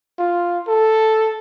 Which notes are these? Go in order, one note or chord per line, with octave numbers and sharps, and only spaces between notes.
F4
A4